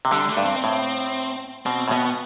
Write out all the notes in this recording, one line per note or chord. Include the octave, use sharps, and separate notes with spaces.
C3
D3 G3
A3
G2
C4
A2
B2 C4
A2
B2 B3